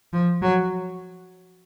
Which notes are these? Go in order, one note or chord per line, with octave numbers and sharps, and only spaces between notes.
F3
F#3